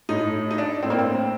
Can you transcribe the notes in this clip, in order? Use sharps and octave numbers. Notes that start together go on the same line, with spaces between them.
A2 D#4
D#4
D4
A2 C4
A#3
C4